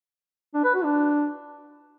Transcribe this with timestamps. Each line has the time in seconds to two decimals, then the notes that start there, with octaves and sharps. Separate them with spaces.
0.54 D4
0.64 B4
0.75 F#4
0.84 D4